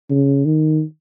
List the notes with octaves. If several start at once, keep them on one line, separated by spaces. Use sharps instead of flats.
C#3
D#3